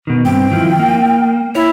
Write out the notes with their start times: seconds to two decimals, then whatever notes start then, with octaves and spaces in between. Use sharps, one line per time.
0.07 B2 D#3
0.25 G2 C4 G5
0.51 D#3 F3 E4
0.79 A#3
1.55 E4 C#5